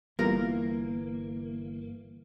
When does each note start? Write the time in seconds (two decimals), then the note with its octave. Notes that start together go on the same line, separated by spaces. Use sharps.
0.19 G1 E3 G3 A#3 B3 F4 A#4